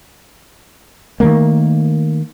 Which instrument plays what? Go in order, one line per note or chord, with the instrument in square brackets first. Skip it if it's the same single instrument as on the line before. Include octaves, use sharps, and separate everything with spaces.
[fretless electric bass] D#3 F#3 A3 A#3